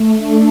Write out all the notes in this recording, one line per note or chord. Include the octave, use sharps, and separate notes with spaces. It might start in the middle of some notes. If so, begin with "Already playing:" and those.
Already playing: A3
D4